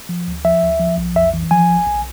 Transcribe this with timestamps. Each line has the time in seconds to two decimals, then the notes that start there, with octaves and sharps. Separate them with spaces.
0.09 F3
0.28 D2
0.44 F3 E5
0.62 D2
0.80 F3
0.98 B1
1.15 F2 E5
1.34 E3
1.51 F3 G#5
1.69 A1
1.86 B1